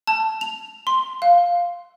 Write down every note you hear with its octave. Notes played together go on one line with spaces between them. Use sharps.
A5
F7
C6
F5